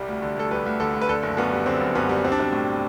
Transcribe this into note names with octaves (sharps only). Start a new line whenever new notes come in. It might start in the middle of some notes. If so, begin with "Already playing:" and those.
Already playing: C2 G3
D2
D3
D2 A4
G3 B4
D2
D3 A4
D2
B4
D3 A4
F#1
F#2 B3
G3
D3 C4
F#1
F#2 B3
G3
G3 C4
D4
B1 C4
A2